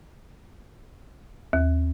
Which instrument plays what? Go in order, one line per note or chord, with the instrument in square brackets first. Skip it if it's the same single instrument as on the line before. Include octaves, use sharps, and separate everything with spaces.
[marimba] D#2